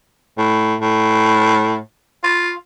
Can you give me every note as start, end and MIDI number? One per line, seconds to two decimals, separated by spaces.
0.38 0.75 45
0.81 1.78 45
2.24 2.52 65